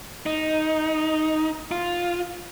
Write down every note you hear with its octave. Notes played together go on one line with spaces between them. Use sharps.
D#4
F4